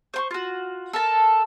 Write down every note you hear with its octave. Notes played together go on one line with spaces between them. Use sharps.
C5 C6 C#6
F4 F#4
A4 A#4 A5